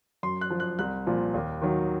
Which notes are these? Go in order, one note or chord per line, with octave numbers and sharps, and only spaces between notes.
F#2 C6
F#6
F3
F#6
C2 F#6
A#2 F3
D#2
D#3 F#3